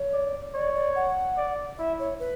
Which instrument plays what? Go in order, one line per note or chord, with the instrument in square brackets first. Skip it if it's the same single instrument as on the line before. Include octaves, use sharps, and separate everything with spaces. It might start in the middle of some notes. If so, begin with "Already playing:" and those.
Already playing: [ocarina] C#5
[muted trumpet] D5
[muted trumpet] C#5 [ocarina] D5
[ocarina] D5
F#5
[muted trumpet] D5
[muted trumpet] E4 [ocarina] E5
[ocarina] C#5
B4